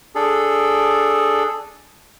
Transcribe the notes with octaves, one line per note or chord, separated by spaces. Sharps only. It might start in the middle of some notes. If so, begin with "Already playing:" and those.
D4 G#4 A4